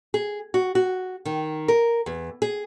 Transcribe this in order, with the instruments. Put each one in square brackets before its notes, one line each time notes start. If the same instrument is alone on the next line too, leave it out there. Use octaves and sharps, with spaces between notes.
[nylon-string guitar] G#4
F#4
F#4
D#3
A#4
E2
G#4